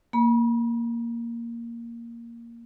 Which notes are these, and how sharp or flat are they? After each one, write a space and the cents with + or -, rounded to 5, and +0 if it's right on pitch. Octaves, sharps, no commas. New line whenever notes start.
A#3 +0 B5 -40